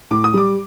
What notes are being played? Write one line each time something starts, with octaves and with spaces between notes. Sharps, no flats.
A2 D6
D#6
G3 D6